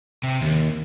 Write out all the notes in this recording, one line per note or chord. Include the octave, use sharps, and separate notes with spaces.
C3
D#2